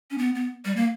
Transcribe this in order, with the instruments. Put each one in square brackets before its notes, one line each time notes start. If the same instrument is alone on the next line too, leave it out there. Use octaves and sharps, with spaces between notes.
[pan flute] C#4
B3
B3
G3
A#3